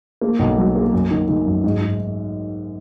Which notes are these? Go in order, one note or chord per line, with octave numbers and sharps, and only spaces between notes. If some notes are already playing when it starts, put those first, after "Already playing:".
A#3
B1
F#3
A#3
F#2
D#3
D#3
F#2
G#2
G#2